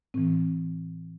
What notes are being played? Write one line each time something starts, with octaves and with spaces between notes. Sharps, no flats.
A2 E3 C4